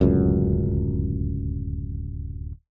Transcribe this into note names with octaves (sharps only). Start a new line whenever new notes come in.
D1 C#2 F#2